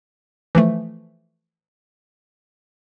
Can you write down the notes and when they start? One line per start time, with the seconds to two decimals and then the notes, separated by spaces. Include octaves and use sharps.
0.55 E3 F3 A3